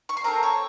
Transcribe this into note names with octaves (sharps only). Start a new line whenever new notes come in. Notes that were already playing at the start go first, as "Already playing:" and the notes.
C#6
C6
C4 F#4 A4 A#4 A#5
C#5 C#6